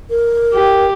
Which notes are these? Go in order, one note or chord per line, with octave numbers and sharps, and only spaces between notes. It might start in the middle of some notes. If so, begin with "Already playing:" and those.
A#4
G4